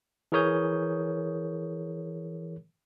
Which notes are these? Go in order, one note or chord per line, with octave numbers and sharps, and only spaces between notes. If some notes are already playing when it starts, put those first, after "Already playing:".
E3 G#4 A#4 C#5 D#6 G6